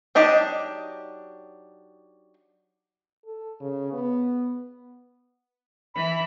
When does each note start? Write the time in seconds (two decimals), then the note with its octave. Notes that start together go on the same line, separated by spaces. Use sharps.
0.15 F#3 D4 D#4 G4 D#5
3.26 A4
3.60 C#3
3.93 B3
5.95 E3 B5